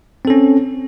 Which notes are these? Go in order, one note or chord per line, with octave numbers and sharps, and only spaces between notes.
C4 C#4 A4